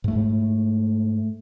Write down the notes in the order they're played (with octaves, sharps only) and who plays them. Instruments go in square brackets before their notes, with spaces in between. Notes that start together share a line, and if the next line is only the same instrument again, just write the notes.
[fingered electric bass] G#2 A3